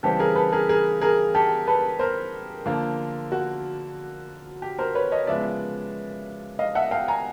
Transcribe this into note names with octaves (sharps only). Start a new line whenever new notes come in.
C#3 E3 G3 C4 G4 A4
G#4 A#4
A4 B4
G#4 A#4
G#4 A#4
G#4 A#4
G4 A4
A4 B4
A#4 C5
D3 F3 A#3
F#4
G4
A#4 C5
B4 C#5
C#5 D#5
C#3 F3 G#3 B3 D5 E5
D#5 F5
E5 F#5
F5 G5
G#5 A#5